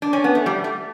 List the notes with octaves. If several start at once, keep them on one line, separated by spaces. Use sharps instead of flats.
D4
C#4
B3
A3
G3
A3